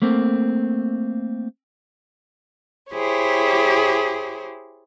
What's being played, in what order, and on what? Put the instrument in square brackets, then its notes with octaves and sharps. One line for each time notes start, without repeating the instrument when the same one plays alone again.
[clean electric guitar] A3 A#3 C4
[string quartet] E4 G4 G#4 C5 C#5